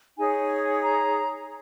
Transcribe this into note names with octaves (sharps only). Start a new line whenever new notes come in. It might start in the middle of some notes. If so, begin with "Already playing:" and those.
D#4 G#4 C#5 G#5
A#5